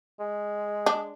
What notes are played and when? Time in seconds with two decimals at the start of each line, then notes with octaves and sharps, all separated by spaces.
0.20 G#3
0.86 D4